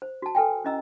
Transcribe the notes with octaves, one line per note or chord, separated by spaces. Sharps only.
C5
F#4 A5
A4 B4 G5 G#5
C#4 E4 D#5 A#5 E6